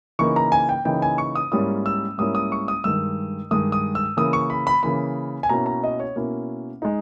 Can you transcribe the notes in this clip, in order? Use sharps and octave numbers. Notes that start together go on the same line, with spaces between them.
C#3 E3 A#3 D#4 C#6
A#5
G#5
G5
C#3 E3 A#3 D#4 G5
G#5
C#6
D#6
G#2 G3 A#3 C#4 E4 D#6
E6
G#2 G3 A#3 C#4 E4 D#6
D#6
C#6
D#6
G2 D#3 G#3 E6
G2 D#3 G#3 D#6
D#6
E6
C#3 E3 A#3 D#6
C#6
B5
B5
C#3 E3 A#3 B5
G#5
B2 A#3 C#4 E4 A#5
A#5
D#5
C#5
B2 A#3 C#4 E4
G#3 D#4